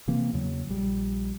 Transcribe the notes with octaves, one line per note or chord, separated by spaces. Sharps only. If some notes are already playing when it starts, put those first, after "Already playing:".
C3 E3 A#3 C4
E2 C#3 F#3 A#3
A#1 G3